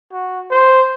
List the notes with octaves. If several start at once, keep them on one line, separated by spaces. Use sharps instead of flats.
F#4
C5